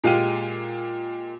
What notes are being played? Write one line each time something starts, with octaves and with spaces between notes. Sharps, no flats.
A#2 G#3 F4 G4 D#7